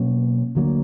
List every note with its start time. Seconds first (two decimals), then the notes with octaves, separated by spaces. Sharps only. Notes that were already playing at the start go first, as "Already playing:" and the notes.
Already playing: B2 F#3 A#3 C#4
0.55 D2 D3 F#3 A#3